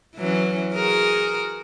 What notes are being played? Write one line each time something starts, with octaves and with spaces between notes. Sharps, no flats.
E3 F#3 C#4
F#4 G#4 A#4